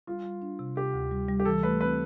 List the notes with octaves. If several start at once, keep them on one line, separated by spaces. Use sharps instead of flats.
G3 F4
G3
D4
C3
C3 G4
D2
G3
G3
G4
E3 A4
A3 B4
C4 B4